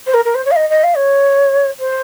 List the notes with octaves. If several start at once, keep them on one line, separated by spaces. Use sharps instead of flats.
C5
A#4
A#4
C5
C#5
F5
D#5
D#5
F5
C#5
C5